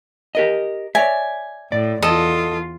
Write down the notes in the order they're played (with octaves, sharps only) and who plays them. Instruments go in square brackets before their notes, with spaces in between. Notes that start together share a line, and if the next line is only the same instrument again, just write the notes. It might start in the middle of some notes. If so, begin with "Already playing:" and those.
[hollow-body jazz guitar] G4 A#4 D#5
[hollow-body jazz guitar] C#5 D5 E5 [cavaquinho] G#5
[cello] A2 [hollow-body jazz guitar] D5
[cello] E2 F4 [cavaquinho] A4 D#5